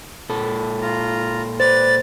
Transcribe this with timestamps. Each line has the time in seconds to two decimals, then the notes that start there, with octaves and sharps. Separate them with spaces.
0.29 A#2 A4
0.82 F4 A#5
1.60 B4 C5 D5 A6